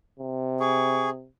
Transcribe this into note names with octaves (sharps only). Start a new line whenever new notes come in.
C3
G#4 C#6